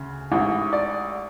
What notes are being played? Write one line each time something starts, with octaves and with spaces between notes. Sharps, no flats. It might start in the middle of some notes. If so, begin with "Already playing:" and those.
Already playing: D2 C#3
A1 G#2 E3
D5